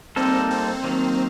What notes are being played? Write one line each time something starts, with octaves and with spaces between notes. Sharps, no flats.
G3 A#3 C4 D#4 A4
C4
D#3 F#3 A#3